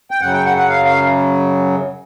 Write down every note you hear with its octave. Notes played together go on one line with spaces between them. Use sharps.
G5
F#2 C#3 F#3 F#5
G5
F#5
F#5
F5
F5